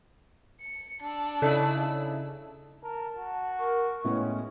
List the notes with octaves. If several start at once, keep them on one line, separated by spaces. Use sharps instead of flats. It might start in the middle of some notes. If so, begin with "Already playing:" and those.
C#7
D4 E6
C#3 D#4 E4 A4 D5
A#4 A5
F#4
A#4 C#6
A2 G#3 B3 C#4